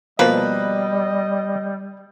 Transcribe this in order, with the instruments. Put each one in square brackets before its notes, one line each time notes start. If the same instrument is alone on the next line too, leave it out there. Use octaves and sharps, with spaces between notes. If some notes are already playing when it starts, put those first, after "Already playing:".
[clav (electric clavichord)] B2 F3 A#3 [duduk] G3 [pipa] B4 [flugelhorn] D#5